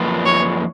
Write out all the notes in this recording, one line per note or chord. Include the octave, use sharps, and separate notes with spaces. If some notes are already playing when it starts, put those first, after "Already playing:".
Already playing: F#2 F3 A#3 F4 B4
C#5